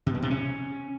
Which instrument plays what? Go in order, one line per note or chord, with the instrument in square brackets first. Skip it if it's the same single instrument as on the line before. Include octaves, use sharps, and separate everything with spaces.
[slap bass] C3
B2
C3
C#4